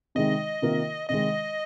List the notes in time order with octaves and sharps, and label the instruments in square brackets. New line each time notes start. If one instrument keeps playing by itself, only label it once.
[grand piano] C3 D#3 G#3 D#4 [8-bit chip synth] D#5
[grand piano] C3 D#3 A#3 F4 A#4
[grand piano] C3 D#3 G#3 [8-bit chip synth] D#5